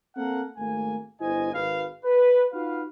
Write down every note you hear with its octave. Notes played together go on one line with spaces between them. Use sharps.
A#3 C4 A4 A#4 F5 F#5
G#1 A3 A#3 G#5
G1 E4 C5 D#5 G#5
G#1 B4 F5
B4
D#4 F4 F#4 B4 F5